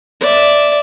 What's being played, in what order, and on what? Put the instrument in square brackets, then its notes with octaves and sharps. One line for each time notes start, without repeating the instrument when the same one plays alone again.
[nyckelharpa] D5 E5